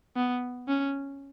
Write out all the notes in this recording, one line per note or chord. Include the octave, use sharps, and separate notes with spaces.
B3
C#4